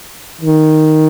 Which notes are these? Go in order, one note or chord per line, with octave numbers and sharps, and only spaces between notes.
D#3